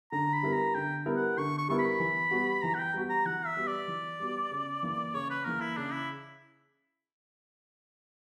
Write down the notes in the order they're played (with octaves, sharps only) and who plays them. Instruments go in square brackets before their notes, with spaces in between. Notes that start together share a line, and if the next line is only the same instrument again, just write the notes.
[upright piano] D3 [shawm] A#5
[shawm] B5
[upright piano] G3 B3 E4 A#4
[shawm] A#5
[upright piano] D3 [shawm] G5
[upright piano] G3 B3 E4 A#4
[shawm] F#5
[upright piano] D3 [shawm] C#6
[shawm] C#6
[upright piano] G3 B3 E4 A#4 [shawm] C#6
[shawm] B5
[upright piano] E3
G3 B3 F#4
[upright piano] E3 [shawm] A#5
[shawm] F#5
G5
[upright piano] G3 B3 F#4
[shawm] A#5
[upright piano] E3 [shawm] F#5
[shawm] E5
[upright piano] G3 B3 F#4
[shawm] D5
[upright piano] E3
G3 B3 F#4
C#3
E3 A#3
[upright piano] C#3 [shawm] C#5
[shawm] B4
[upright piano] E3 A#3 [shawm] A#4
[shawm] E4
[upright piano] C#3 [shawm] D4
[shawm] E4